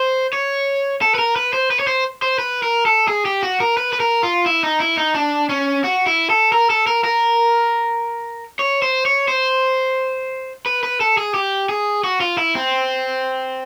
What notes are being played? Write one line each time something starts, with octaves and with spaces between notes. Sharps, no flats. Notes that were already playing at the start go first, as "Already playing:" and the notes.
Already playing: C5
C#5
A4
B4
A#4
B4
C5
B4
C#5
C5
C5
B4
A#4
A4
G#4
G4
F#4
A#4
B4
B4
A#4
F4
E4
D#4
E4
D#4
D4
C#4
F#4
E4
A4
A#4
A4
A#4
A#4
C#5
C5
C#5
C5
B4
B4
A4
G#4
G4
G#4
F#4
F4
E4
C4